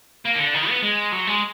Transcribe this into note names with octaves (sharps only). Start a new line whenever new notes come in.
A#3
D#3
D3
D#3
B3
G#3
F#3
G#3